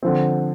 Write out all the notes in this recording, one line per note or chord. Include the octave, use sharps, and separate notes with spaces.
D3 F3 C4